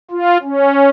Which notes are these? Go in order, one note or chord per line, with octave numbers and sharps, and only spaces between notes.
F4
C#4